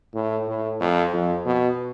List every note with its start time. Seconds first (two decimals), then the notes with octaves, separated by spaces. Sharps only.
0.14 A2
0.48 A2
0.80 F2
1.13 F2
1.45 B2